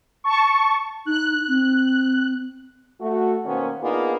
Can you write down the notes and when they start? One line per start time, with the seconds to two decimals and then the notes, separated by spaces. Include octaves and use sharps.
0.24 A5 C#6
1.06 D#4 F#6
1.48 C4
3.01 A3 F#4
3.45 B2 D#3 A#3 B3 C#4 C5
3.81 A#3 B3 D4 D#4 F4 G#4